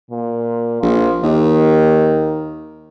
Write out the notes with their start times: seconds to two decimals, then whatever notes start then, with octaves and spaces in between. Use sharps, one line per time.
0.11 A#2
0.82 A#1 F3
1.23 D#2 D#3